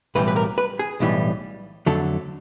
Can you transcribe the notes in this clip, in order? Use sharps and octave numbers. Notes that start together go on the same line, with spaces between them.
B1 A2 E3 G3 B4
B4
A#4
B4
G#4
B1 A2 E3 G3
F2 D3 F#3 A3 A4